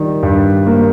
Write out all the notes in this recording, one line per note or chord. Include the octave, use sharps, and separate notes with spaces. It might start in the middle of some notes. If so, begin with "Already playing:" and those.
Already playing: D#3 G3
G2
A#3